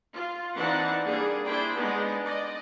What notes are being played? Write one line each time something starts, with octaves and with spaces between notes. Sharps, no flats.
F4
E3 C4 D4 D#4 F#5 A5
G3 A#3 D4 G#4
D4 E4 G#4 C5 G5
G#3 B3 D4 D#4
D5 D#5